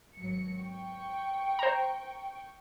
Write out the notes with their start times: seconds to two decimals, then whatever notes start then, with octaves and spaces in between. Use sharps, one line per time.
0.16 G#1 F#3 C#7
0.59 G5 C#6
1.59 C5 A#5